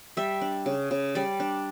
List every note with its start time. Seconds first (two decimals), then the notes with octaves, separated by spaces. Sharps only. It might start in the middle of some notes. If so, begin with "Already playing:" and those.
0.17 G3 E5
0.41 D4
0.66 C#3
0.91 C#3
1.15 G3 D5
1.40 D4